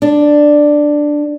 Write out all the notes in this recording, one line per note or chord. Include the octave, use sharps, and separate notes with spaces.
D4